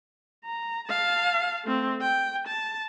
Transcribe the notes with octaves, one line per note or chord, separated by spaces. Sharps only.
A#5
F5 A5
A3 C4
G5
A5